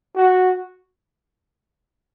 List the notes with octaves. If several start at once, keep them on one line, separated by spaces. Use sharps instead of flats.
F#4